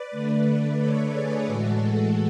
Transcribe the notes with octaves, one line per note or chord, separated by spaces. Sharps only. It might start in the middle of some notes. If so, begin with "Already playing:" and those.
Already playing: B4 D5
D3 A3
A4 C#5
G#4 B4
A2 E3 G#3 F#4 A4
F#4 A4